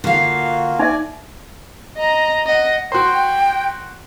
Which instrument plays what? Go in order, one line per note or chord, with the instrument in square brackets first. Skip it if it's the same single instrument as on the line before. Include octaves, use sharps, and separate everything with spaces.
[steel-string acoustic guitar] D3 F5 [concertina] A#3 F4 F#4
[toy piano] D#4 E5 [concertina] D5 G#5
[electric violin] D#5 A#5
D#5 F#5
[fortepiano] F#4 C5 [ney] G5